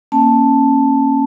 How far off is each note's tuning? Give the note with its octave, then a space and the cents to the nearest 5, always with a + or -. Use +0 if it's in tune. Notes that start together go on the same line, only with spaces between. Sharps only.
A#3 +5 C#4 -15 A5 +0